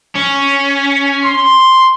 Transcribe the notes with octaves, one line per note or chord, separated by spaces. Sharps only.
C#4
C6